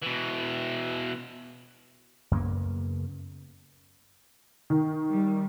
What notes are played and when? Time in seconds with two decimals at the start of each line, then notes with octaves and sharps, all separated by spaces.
0.03 B2 E3
2.31 F#2 C#3 A#3 B3
4.70 D#3
5.10 G3